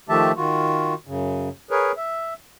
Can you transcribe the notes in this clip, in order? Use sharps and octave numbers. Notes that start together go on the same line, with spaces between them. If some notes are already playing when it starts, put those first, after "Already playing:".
D#3 F3 A3 G4 E5 A5
D#3 F4 F#4
F#2 C#3
G#4 A#4 B4 C#5
E5